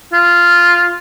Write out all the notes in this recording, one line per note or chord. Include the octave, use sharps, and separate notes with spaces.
F4